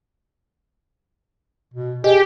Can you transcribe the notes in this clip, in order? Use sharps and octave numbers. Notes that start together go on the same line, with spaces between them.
B2
G4 G#4 D#5